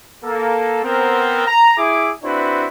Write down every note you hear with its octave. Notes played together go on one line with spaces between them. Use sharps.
A#3 A4
B3 C4 A#4
A#5
E4 G#4 D6
C4 D4 E4 F#4 B4 C5